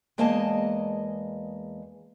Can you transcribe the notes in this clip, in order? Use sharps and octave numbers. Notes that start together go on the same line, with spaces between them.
E2 G#3 A#3 D#5 G#5 A5